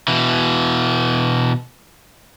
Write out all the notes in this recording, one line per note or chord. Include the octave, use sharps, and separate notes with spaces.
B2 E3